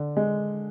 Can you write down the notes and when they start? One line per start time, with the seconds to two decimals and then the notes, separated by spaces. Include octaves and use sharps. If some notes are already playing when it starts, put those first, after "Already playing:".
Already playing: D3
0.17 G#3